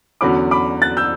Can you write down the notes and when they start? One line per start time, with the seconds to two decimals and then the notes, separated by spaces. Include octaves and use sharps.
0.21 E2 D3 F#3 C#4 B5 D6
0.51 B5 D6
0.82 F#6 A6
0.97 E6 G6